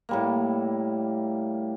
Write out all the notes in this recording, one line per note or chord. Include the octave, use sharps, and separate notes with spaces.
A2 G3 A#3